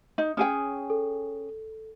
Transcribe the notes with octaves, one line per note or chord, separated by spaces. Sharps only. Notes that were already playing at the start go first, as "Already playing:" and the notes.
D#4
C#4 G#4 G5 D#6
A4